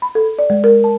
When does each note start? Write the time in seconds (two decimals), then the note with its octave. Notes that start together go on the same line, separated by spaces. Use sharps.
0.02 B5
0.15 A4
0.39 D5
0.50 G#3
0.64 A#4
0.84 A5